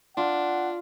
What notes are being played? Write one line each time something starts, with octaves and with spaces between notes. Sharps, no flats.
D4 F4 F#5